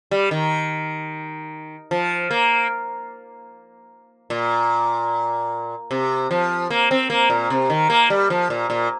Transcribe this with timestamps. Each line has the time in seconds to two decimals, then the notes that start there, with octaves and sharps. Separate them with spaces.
0.11 G3
0.31 D#3
1.91 F3
2.31 A#3
4.30 A#2
5.91 C3
6.31 F3
6.70 A#3
6.91 C4
7.10 A#3
7.30 A#2
7.50 C3
7.70 D#3
7.90 A#3
8.10 G3
8.30 F3
8.50 A#2
8.70 A#2